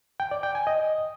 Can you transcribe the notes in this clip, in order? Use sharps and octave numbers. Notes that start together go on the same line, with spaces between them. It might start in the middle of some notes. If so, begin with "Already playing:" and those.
G5
D5
G5
G#5
D#5